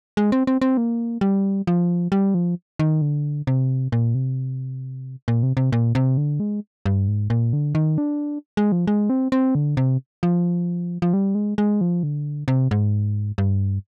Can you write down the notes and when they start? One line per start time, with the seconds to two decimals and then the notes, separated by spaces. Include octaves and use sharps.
0.17 G#3
0.32 C4
0.47 C4
0.61 C4
0.77 A#3
1.21 G3
1.67 F3
2.12 G3
2.34 F3
2.79 D#3
3.01 D3
3.47 C3
3.92 A#2
4.15 C3
5.28 A#2
5.43 C3
5.57 C3
5.72 A#2
5.95 C3
6.17 D3
6.40 G#3
6.86 G2
7.08 G#2
7.30 A#2
7.53 D3
7.75 D#3
7.98 D4
8.57 G#3
8.72 F3
8.87 G#3
9.10 C4
9.32 C4
9.55 D3
9.77 C3
10.23 F3
11.02 F3
11.13 G3
11.35 G#3
11.58 G#3
11.81 F3
12.03 D3
12.48 C3
12.71 G#2
13.38 G2